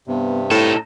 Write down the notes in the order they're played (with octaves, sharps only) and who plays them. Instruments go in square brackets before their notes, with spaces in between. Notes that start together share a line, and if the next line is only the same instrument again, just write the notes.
[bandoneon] G2 C3 [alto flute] B3
[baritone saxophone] A2 [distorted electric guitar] D#4 A4 [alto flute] E4